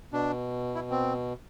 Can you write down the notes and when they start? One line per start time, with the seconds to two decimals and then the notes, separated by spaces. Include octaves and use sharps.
0.12 B2 D4
0.75 E4
0.90 C4